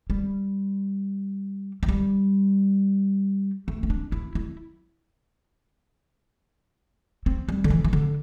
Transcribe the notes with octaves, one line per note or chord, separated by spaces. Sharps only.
G3
E3
G3
A3
C4
D4
E4
E4
C4
G3
D3
E3
E3
D3